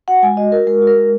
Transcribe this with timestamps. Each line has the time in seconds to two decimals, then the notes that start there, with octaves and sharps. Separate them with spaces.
0.08 F#4 F#5
0.23 G#3 G#5
0.37 F#4 D#5
0.52 F#4 A#4
0.67 G#3 A#4
0.82 F#4
0.87 A#4
0.97 G#3